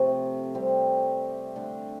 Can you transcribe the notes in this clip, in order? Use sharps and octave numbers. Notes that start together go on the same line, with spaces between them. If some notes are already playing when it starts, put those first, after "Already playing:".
Already playing: C3 F3 A3
G3 C4 G4
D3 A3 D4